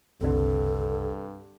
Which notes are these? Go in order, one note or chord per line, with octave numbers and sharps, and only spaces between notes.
F#1 C2 G2 D3 C4 A4